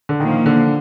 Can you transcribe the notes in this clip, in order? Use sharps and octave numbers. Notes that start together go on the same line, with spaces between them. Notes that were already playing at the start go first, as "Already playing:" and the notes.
D3
A#2 D#3 F3 A#3
D3